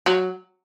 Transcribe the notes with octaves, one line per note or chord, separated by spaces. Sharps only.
F#3